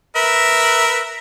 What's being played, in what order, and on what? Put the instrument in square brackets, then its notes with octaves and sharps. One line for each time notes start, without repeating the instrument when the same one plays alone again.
[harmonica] A#4 B4 E5